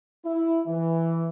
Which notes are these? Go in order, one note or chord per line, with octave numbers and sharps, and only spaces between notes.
E4
E3